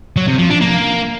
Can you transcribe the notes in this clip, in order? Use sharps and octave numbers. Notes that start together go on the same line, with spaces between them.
F#3
C3
F3
D4
A#3